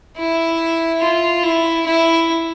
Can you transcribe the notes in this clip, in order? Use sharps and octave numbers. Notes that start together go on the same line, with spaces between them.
E4
F4
E4
E4